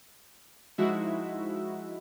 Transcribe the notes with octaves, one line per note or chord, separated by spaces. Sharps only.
F3 G#3 D#4 E4 F#4 E5